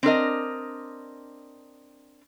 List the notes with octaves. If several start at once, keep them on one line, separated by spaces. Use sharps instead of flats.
C4 D4 A#4 D#5